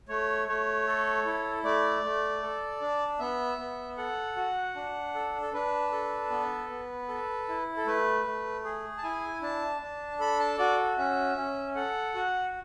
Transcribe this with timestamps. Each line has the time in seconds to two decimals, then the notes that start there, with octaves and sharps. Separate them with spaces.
0.08 A3 C#5
0.47 A3 C#5
0.87 A4
1.25 E4
1.64 A3 D5
2.04 A3
2.42 A4
2.82 D4
3.19 B3 E5
3.58 B3
3.98 A4 F#5
4.36 F#4
4.76 D4
5.15 A4
5.42 A4
5.54 D4 B4
5.92 A4
6.30 B3
6.70 B3
7.08 A4
7.48 E4
7.77 A4
7.86 A3 B4
8.25 A3
8.64 G#4
8.98 A5
9.03 E4 G#5
9.42 D4 A5
9.81 D4
10.19 A4 B5
10.39 A5
10.58 F#4 D5
10.98 C#4 E5
11.37 C#4
11.75 A4 F#5
12.15 F#4